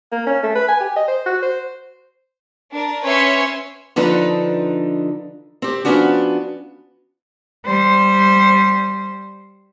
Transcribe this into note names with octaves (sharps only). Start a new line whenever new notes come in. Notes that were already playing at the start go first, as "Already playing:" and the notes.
A#3
C#4
A3
B4
G#5
G4
D#5
C5
F#4
C5
D4 A#4
C#4 B4 C#5 E5 C6
D3 F3 D4 D#4 B4
C4 G4
F3 G#3 B3 C#4 D4 F#4
G3 C5